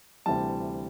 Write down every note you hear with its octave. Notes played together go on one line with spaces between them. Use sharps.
D2 C3 E3 G3 A5